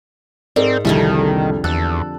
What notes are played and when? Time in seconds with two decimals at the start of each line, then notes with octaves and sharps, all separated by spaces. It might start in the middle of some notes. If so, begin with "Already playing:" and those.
0.56 G#2 C4 G#4 A#4 D5
0.85 C2 F2 D3 D#3 G3
1.64 E2 A4 F#6